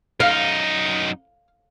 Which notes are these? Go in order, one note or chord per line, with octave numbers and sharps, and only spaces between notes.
F#2 D#4 F5